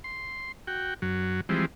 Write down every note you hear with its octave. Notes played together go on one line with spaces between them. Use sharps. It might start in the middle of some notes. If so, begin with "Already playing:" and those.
C6
F#4 G5
F#2 F#3
E3 F3 G3 G#3 C4